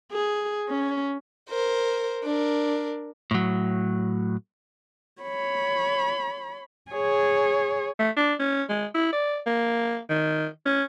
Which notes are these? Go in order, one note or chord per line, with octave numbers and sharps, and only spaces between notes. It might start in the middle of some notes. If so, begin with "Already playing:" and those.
G#4
C#4
A#4 C5
D4 A#4
A2 F#3
C#5 B5
G#4 C#5
A3
D4
C#4
G#3
E4
D5
A#3
D#3
C#4